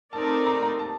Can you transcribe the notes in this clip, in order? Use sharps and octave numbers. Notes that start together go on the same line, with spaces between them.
A3 C4 D#4 A#4 D5 A5
A#5
A#5
A5